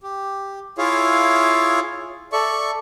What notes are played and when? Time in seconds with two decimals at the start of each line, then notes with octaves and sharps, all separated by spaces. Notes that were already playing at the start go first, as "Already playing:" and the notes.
0.03 G4
0.78 E4 F4 G#4 C#5 E5 F5
2.33 A4 D5 E5 C#6